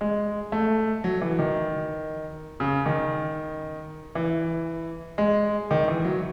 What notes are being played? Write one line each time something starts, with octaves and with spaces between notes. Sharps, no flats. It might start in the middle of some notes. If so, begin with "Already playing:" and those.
G#3
A3
F#3
E3
D#3
C#3
D#3
E3
G#3
D#3
E3
F#3